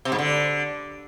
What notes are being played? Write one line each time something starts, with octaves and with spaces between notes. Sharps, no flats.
C3
G#2
D3